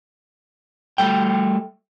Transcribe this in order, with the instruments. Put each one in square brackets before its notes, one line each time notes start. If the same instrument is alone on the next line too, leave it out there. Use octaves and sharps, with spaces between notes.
[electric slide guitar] G3 A3 G5